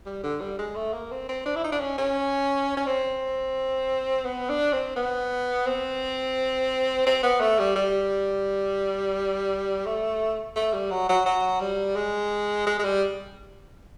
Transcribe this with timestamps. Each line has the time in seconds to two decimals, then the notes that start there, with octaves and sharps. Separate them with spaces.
0.06 G3
0.23 D3
0.41 G3
0.59 G#3
0.76 A3
0.93 A#3
1.11 C4
1.29 C4
1.46 D4
1.56 E4
1.64 D#4
1.72 D4
1.80 C#4
1.98 C#4
2.77 C#4
2.86 C4
4.25 B3
4.49 D4
4.73 C4
4.96 B3
5.67 C4
7.06 C4
7.23 B3
7.40 A3
7.59 G3
7.76 G3
9.86 A3
10.56 A3
10.73 G3
10.91 F#3
11.09 F#3
11.26 F#3
11.61 G3
11.96 G#3
12.67 G#3
12.79 G#3
12.84 G3